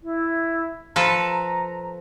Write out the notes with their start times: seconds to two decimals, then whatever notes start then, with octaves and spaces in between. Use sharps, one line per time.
0.03 E4
0.96 F3 A4 B4 A#5